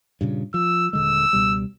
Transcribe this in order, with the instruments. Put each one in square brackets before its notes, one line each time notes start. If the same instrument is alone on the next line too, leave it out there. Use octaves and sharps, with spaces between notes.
[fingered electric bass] G2 A#2 C#3
[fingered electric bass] F3 [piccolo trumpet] E6
[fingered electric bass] D#1 D3 G#3 [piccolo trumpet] E6
[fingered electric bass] C#2 B2 G3